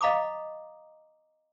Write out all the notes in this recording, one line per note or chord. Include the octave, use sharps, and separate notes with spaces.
D#5 F5 A#5 B5 D6 D#6